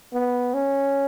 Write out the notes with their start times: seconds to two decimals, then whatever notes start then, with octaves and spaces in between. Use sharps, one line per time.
0.13 B3
0.54 C#4